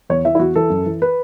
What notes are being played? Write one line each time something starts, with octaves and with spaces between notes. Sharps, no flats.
E2 C#5
E3 E5
E4
E2 F#4
E3 A4
F#2
E3
B4